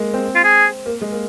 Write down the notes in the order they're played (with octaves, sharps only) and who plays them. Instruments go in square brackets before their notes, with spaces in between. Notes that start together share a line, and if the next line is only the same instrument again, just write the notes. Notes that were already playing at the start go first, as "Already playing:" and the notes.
Already playing: [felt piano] G#3 A#3
C4
[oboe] F4
G#4
[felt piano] A#3
G#3
A#3